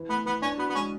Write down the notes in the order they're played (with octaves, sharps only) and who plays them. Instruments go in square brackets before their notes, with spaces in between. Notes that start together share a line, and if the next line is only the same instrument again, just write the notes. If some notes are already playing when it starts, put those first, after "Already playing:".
Already playing: [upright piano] E3
[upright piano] A3 [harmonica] B3
[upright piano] E3 [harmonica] B3
[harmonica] C#4 [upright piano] D4
[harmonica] B3 [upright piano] F#4
[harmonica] B3
[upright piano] G#3 [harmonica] C#4